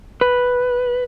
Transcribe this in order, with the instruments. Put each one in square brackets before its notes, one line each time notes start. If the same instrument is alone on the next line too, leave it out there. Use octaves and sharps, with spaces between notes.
[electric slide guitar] B4